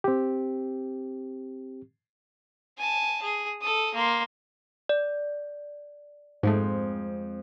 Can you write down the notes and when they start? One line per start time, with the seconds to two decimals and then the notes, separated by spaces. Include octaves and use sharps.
0.04 C4 G4
2.77 G#5 A5
3.22 G#4
3.61 A4 D#6
3.94 A#3 C6
4.89 D5
6.43 F2 G#2 G#3 A3 C4